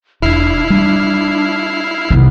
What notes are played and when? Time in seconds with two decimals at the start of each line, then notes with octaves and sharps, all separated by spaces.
0.22 E1 D4 E4 F6 C7
0.70 G3 D4
2.10 C2 B3